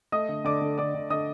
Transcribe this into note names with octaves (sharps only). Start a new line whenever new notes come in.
A3 D#5 D#6
D3
D3 D5 D6
D3
D3 D5 D6
D3
D3 D#5 D#6